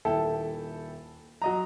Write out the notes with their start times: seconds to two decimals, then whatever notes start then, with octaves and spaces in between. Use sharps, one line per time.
0.05 D#1 E4 A4 G5
1.42 F#3 D#5 A#5